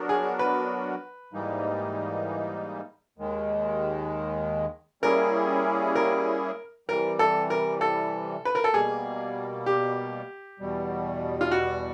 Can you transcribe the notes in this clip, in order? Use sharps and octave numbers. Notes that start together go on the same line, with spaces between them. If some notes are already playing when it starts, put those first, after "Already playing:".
Already playing: F#3 B3 D4 F#4 A#4
G#4
B4
G#2 E3 G3 A#3 D#4
D#2 D#3 G#3
G3 A#3 C#4 E4 G#4 A#4
A#4
C3 E3 G3 A#4
A4
A#4
A4
B4
A#4
A4
B2 G3 A#3 G#4
G4
E2 B2 G3
F4
F#4